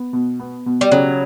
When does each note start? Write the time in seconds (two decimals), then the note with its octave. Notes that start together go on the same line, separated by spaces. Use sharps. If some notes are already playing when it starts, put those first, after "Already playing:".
Already playing: B3
0.13 B2
0.40 B3
0.66 B2
0.81 G3
0.92 C#3 F#3